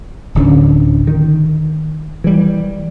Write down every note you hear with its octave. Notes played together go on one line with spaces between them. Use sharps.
D1 D3 C#4
D#3
E3 G3